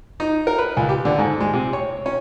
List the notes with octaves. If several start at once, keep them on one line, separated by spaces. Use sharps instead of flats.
D#4
A#4
B4
C#2
G4
D3
G#2
G#3
C3
C#5
C#4